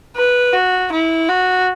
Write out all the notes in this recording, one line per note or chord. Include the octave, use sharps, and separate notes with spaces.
B4
F#4
E4
F#4